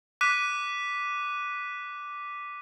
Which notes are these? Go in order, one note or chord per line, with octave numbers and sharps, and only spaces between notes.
D6 F#6 B6 D#7